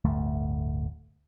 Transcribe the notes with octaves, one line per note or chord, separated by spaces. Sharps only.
D1 G1 D2 A3